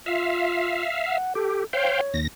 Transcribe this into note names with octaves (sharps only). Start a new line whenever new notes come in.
F4 E5 F5
F#5
G4 A4
C5 C#5 F5 G5
D#2 A#6